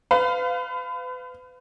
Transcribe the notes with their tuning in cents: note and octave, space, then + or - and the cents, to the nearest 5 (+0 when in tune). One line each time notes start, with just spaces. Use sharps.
B4 +35 F5 +0